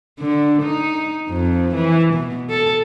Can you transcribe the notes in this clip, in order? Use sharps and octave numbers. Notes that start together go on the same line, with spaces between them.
D3
D#4
F2
E3
B2
A4